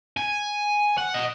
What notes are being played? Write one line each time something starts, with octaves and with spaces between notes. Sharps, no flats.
G#5
F#5
D#5